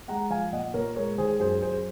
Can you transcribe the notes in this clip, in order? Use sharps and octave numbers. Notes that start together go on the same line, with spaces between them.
G#3 F#5 A#5
F3 F5 G#5
A#2 D#5 F#5
A#2 A#4 C#5
G#3 A#4 C#5
D#3 G#4 C5
F#2 G#4 C5
F#2 G#4 C5